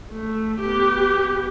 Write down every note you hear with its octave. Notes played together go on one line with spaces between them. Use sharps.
A3
B3 G4